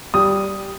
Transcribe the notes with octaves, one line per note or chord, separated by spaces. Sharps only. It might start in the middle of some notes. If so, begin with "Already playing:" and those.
G3 D#6